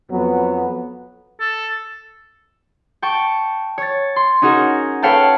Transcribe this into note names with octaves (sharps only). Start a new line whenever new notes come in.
F2 F#3 B3
A4
G5 A5 C#6
C#5 A6
C6
C#4 D#4 F#4 G#4 A#4
A4 B4 C#5 F5 G5 A5